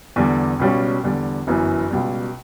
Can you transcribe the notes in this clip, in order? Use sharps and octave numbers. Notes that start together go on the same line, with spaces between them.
E2 D3 G3
C#2 B2 G3 C#4
E2 D3 G3
G1 F#2 E3
C#2 B2 G3